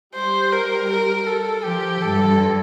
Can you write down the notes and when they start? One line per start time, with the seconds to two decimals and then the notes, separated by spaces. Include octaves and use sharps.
0.14 G3 C5
0.52 A#4
0.90 A#4
1.27 A4
1.64 F3 G4
2.02 G2 A4